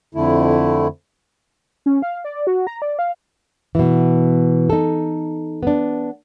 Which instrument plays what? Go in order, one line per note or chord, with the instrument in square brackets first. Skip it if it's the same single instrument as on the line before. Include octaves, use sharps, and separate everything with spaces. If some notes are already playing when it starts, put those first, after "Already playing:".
[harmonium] F2 D3 A3 E4
[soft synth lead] C#4
F5
D5
F#4
A#5
D5
F5
[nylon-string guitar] B2 E3
D#4 A4
B3 D4